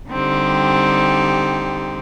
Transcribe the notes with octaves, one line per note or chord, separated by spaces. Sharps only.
D3 G3 C4 D#4 G4